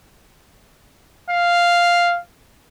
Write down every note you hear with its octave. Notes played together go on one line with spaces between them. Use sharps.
F5